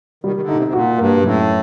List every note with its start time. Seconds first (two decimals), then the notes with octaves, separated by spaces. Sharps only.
0.24 D#3 G3
0.36 D#3
0.40 D3
0.48 A#2 D#4
0.57 C3
0.67 C3
0.73 A#2 F#4
0.98 G2 A#3
1.23 F#2 A2